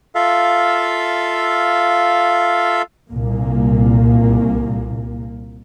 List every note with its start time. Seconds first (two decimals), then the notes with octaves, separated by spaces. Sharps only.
0.15 F4 A4 E5 F5
3.11 C2 A#2 A#3